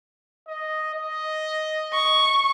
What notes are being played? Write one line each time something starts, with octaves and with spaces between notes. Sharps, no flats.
D#5
D#5
C#6